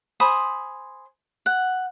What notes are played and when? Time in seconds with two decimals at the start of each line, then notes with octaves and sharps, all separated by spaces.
0.20 C5 G#5 B5 D#6
1.46 F#5